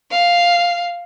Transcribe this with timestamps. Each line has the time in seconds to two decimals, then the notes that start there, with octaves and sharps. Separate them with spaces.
0.11 F5